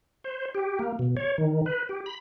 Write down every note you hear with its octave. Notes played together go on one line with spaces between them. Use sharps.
C5
G4
A#3
B2
C#5
D#3
B4
G4
B5